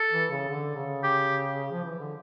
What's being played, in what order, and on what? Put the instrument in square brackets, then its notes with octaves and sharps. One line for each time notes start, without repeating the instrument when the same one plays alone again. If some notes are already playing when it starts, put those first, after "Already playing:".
Already playing: [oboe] A4
[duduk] E3
C#3
D3
C#3
[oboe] G4
[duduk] F3
E3
D3